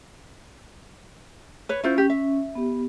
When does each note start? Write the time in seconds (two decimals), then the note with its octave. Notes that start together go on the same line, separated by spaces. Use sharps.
1.69 B4 C#5
1.84 C#4 E4 F4 C5
1.98 G4
2.10 E5
2.55 B3 G4